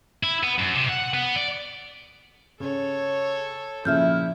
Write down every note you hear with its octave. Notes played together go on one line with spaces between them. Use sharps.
E4
B3
F#2
C3
F#5
B3
D5
C#3 A4 C#5
A#2 C#3 F3 E4 E5 F6 G6